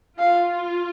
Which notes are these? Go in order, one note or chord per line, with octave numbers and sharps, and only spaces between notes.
F4 F5